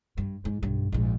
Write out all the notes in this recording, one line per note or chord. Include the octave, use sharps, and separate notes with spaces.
G2
G#2
B1 G2
A#1 G#2